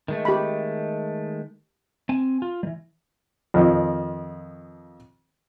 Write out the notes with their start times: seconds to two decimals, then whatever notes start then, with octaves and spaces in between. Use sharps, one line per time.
0.08 D#3 G#3 A3
0.25 G4 B5
2.09 C4 G#5
2.42 F4
2.63 E3 G3
3.54 F2 D#3 F3